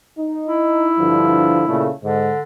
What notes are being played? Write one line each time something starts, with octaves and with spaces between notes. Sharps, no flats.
D#4
E4
G2 D3 F3
A#2 C#3 A3
G#2 D3